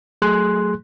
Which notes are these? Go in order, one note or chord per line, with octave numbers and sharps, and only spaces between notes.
F#3 A3 G#4 C6 F#6